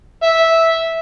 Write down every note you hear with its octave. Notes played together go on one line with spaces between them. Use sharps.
E5